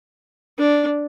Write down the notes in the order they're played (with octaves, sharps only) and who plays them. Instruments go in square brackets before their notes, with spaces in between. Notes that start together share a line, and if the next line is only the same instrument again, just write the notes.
[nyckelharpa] D4